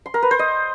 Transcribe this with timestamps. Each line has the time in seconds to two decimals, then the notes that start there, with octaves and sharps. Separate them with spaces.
0.06 C6
0.14 A#4
0.22 B4
0.31 C5
0.39 D#5